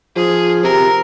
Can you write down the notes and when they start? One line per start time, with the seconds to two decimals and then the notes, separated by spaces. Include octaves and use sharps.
0.16 F3 G#4
0.64 C3 A#4